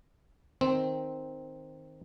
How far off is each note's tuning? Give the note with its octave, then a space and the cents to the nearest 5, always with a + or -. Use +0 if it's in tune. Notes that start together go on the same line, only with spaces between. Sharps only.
D#3 +0 C4 +0